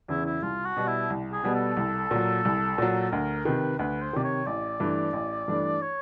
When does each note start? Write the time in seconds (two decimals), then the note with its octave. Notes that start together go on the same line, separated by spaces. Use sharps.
0.09 E2 C#3 E3 E4
0.25 E4
0.42 C2 F4
0.65 F#4
0.77 B2 G3 B3
0.88 E4
1.10 C2
1.33 G#4
1.43 B2 G3 B3
1.54 A4
1.77 C2
2.11 A#2 F#3
2.45 C2
2.78 A#2 F#3
3.01 A4
3.12 D2 A#4
3.45 C3 D#3 B4
3.79 D2 B4
4.02 C5
4.13 C3 D#3 D5
4.24 C#5
4.46 A1 D5
4.80 G2 E3 A3 D4
5.13 A1
5.48 G2 E3 A3 D4
5.82 C#5